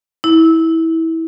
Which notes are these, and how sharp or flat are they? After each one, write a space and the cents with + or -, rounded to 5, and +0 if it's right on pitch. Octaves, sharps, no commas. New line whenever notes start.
E4 -20